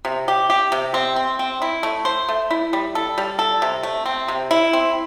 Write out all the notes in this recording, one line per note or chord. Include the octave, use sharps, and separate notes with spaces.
C3
G4
G4
C3
C4
C4
C4
E4
A3
C5
A3
E4
G3
A4
G3
A4
C3
A3
C4
C3
E4
C4